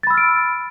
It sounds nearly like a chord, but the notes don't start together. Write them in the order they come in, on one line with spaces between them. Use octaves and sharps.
A6 B5 E6 F6 D7